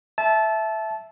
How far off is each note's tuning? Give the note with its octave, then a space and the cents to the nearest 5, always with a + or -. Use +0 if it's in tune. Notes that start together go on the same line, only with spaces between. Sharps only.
E5 +0 A5 -20